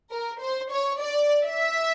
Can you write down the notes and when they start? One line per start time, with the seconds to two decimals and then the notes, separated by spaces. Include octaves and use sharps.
0.11 A#4
0.40 C5
0.71 C#5
1.00 D5
1.46 E5